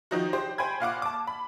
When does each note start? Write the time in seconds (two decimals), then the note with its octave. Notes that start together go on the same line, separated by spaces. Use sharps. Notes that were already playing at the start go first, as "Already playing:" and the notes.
0.11 D#3 F3 D#4 F#4
0.33 G4 C5
0.58 C5 G5 G#5 B5 G#6
0.80 A#2 F5 F#5 D6
1.02 A5 D6
1.27 B5